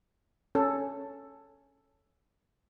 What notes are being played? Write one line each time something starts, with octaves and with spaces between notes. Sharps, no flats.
C#4 A4